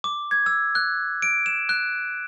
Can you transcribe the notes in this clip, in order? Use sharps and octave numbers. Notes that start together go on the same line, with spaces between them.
D6
G#6
E6
F#6
D7
E7
F#6